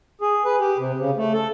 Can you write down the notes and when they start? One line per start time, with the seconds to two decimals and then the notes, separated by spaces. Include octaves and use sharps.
0.21 G#4
0.45 B4
0.60 G4
0.78 C3
0.98 C#3
1.17 A3
1.34 A4